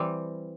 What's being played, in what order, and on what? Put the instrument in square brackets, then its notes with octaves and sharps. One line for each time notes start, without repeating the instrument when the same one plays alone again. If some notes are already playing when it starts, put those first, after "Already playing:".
Already playing: [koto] E3 G3 C4